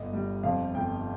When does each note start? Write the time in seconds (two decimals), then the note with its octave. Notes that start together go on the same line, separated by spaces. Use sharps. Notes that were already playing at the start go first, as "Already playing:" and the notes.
Already playing: G1 D#5
0.13 G3
0.43 F2 F5
0.74 G1 G5